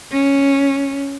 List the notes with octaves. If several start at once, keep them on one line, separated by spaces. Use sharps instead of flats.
C#4